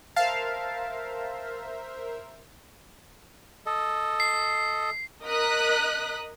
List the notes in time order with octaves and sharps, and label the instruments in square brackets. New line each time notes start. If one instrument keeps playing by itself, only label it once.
[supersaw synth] A#4 C5 E5 [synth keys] F5 A5
[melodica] A4 D#5
[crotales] C7
[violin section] A#4 D#5 D#6 F#6 B6